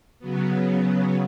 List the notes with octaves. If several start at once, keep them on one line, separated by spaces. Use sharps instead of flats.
C#3 F#3 B3